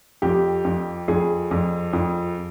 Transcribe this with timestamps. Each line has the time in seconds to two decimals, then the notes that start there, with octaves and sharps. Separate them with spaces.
0.22 F2 G4
0.65 F2
1.08 F2 G#4
1.51 F2
1.93 F2